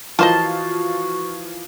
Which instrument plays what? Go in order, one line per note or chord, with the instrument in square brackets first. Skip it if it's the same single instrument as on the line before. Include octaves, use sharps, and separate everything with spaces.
[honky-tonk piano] E3 F3 F4 [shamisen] A#3 C5 D#5 [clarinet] F#4 [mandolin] A5